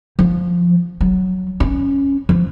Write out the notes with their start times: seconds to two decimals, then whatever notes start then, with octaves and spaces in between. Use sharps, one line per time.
0.19 F3
1.01 F#3
1.60 C#4
2.29 F3